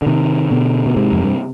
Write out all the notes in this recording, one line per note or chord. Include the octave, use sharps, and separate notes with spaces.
D3
C3 D#3
B2 D3
B2
G#2 C3
F2
G2